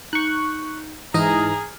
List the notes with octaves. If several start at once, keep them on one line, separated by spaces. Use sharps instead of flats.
D#4 C#6 F#6
G#2 E3 D#4 G#4 D#5 A#5 F6